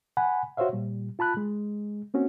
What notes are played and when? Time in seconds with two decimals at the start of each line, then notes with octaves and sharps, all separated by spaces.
0.17 F#5 G#5 B5
0.57 F#4 C5 C#5 E5 F5
0.73 A#2 G3
1.19 F4 A5 B5 F#6
1.37 G#3
2.14 A#3 C4 C#4 F#4